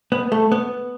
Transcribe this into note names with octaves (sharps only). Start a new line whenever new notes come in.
B3
A3
B3